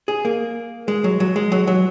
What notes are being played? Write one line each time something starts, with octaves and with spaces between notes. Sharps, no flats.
G#4
A#3
G#3
F#3
F#3
G#3
F#3
F#3